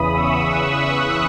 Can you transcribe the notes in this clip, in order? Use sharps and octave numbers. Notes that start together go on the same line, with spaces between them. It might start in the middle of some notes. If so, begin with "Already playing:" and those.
Already playing: E2 C#3 E3 B5 D#6
C#6 E6
D#6 F#6